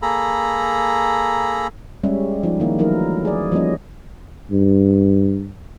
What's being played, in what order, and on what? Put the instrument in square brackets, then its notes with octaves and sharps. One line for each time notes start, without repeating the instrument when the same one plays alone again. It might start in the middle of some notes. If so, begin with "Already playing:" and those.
[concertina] A#3 G#4 A4 A#5 B5
[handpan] G3 G#3 C#4 E5
F3 D#4
D#3 A#3 E4
E3 F#3 A3 D#4 E4 A#4
G#4 D5
F3 G3 A#3 C#4 D#5
[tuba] G2